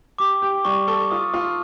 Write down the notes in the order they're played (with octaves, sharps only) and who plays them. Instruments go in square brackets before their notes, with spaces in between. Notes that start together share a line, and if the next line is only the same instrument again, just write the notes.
[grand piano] G4 [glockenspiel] D6
[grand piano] G4
[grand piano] G3 [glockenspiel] C#6
[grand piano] A4 [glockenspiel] C#6
[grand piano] F4 [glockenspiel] D#6
[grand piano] F4